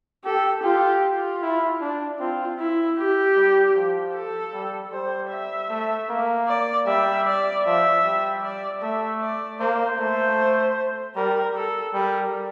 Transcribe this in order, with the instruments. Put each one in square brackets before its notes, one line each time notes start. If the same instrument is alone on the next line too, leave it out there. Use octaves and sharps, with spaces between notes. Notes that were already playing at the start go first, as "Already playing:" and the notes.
[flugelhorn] G4 [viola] A4
[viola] F4 [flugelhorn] G4
[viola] F4
[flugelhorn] E4
D4
[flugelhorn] C4 [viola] F4
[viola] E4
G4
[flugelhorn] G3
F3
[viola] A4
[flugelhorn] G3
[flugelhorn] G3 [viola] C5
[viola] E5
[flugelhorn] A3
A#3
[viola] D5
[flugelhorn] G3 [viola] E5
[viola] D5
[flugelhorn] F3 [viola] E5
[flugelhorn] G3
[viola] D5
[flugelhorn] A3 [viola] E5
[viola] D5
[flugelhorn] A#3 [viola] C5
[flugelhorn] A3 [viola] C5
[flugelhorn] G3 [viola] A#4
[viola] A4
[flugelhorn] G3 [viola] A#4